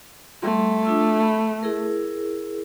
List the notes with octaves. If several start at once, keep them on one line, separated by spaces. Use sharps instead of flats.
G3 A3 C6
D4 F4 E6
B5
E4 G#4 A#4